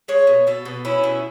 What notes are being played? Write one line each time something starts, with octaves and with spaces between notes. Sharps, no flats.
G#3 C#5
B2
B2 A4
B2
C#4 E4
B2